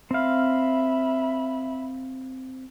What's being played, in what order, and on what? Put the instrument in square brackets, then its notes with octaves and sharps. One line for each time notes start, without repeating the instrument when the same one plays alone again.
[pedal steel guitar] C4 F5 [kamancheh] E5 B5